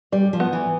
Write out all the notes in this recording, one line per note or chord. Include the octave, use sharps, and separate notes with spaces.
G3 D5
F3
B3
E3